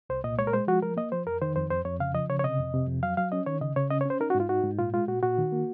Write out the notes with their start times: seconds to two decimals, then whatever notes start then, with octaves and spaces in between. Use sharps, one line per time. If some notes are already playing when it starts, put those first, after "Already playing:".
0.10 C2 C5
0.24 A#2 D#5
0.38 G#3 C#5
0.47 A#4
0.53 G#3 C5
0.68 F3 F#4
0.83 F3 A#4
0.97 A#3 D#5
1.12 F3 C5
1.27 F2 A#4
1.42 D#3 C5
1.56 F2 C5
1.71 F2 C5
1.85 F2 C#5
2.00 C#3 F5
2.14 F3 D#5
2.29 C#3 C#5
2.39 C#5
2.44 C3 D#5
2.58 F2
2.74 C3
2.88 F2
3.03 F#3 F5
3.17 F#3 F5
3.32 C#4 D#5
3.46 D#3 C#5
3.61 C#3 D#5
3.76 C#3 C#5
3.90 C#4 D#5
4.01 C#5
4.05 C#4 C5
4.20 D#4 A#4
4.30 F#4
4.35 G#2
4.40 F4
4.49 D#4 F#4
4.64 G#2
4.78 A#2 F4
4.93 G#3 F4
5.08 A#2 F#4
5.23 A#2 F#4
5.38 D#3
5.52 A#3